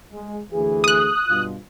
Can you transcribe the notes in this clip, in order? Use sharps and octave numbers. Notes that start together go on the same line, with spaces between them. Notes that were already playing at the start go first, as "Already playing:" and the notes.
G#3
D2 E3 G#4
D#6 F#6
G2 B2 F4